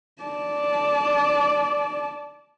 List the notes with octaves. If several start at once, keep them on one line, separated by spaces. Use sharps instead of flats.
D5 A5